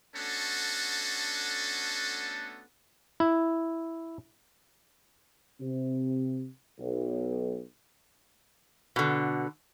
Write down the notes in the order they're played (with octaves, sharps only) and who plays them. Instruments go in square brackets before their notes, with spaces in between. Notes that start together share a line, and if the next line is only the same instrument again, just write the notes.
[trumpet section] A3 B3 C#4 D4 F#4 A4
[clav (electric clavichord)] E4
[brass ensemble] C3
B1
[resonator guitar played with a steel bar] B2 D3